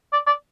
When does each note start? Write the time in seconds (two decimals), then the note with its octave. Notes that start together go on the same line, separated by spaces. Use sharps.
0.13 D5
0.27 D5